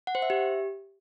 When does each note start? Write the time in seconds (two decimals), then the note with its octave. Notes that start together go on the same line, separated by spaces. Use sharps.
0.07 F#5
0.15 C5
0.22 E5
0.30 G4